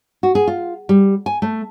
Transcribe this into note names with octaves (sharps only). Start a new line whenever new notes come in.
F#4
G#4
F4
G3
G#5
A3